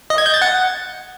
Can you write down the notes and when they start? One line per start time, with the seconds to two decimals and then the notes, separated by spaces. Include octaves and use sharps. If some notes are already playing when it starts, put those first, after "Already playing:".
0.10 D#5
0.18 G#6
0.26 G6
0.34 A6
0.42 F#5